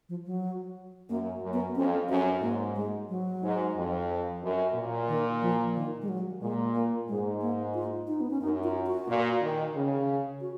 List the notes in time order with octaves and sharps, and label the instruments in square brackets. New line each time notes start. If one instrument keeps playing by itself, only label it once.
[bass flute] F3
F#3
[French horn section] F#2 [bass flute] A#3
[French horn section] F#2
[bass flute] B3
[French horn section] F2 [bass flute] C#4
[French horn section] F#2 [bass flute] C#4
[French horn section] G#2 [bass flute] A#3
[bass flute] G#3
F#3
[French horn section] G#2
F2
F#2
A#2
[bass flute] D#3
F3
D#3
G#3
F#3
[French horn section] A#2 [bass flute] G#3
[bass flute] A#3
[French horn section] G#2 [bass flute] G#3
[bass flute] A#3
F4
D#4
B3
C#4
[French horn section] F#2 [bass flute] D#4
[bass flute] F4
F#4
[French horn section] A#2
D#3
C#3
[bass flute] F#4